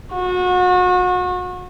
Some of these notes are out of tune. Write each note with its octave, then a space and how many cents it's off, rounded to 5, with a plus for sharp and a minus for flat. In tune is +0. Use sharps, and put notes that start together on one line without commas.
F#4 -35